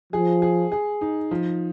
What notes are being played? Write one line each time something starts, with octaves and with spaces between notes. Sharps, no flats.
F3 G#4
G#4
G#4
D#4
F3